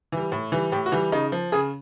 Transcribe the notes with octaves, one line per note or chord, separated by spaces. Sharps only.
E3 G3
A2
E3 G3
A2 G4
F#4
E3 G3
C#3 D#4
F3
C#3 G#4